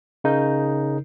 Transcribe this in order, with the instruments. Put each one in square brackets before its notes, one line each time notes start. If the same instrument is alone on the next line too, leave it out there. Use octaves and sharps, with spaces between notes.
[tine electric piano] C#3 D#4 A#4 G6